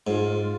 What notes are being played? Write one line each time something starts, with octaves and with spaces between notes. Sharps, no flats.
G#2 F4